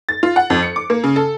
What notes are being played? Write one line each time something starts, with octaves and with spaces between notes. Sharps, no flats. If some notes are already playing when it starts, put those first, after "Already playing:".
A6
F4
F#5
F2
C#7
D6
A#3
C#3
A4